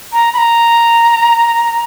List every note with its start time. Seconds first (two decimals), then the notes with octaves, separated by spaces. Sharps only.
0.13 A#5
0.34 B5
0.38 A#5